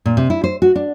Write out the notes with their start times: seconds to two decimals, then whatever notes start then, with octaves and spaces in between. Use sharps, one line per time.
0.06 A#2
0.17 C3
0.30 E4
0.44 C5
0.62 F#4
0.76 D4